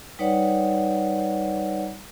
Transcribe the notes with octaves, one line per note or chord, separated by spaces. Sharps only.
G3 D#4 B4 C#5 D5 F#5